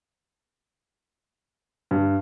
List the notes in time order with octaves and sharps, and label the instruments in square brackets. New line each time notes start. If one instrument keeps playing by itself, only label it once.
[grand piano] G2